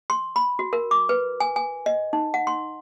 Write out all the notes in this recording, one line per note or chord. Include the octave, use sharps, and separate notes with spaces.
C6
B5
F#4
A#4
D6
B4
G#5
G#5
D#5
D#4
F#5
C6